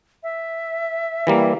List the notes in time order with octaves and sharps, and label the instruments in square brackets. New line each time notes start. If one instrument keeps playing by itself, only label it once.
[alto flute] E5
[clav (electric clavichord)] E3 G3 A#3